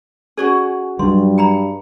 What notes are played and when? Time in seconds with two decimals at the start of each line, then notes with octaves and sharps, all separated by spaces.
0.37 C#4 F#4 G#4 A4 D5
0.99 G2 F#3 G3 D4 C6
1.38 G5 A#5 B5